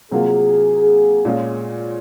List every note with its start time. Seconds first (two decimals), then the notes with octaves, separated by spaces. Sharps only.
0.12 C3 F#3 A#3 F4 G#4
1.25 A#2 G#3 C#4 F4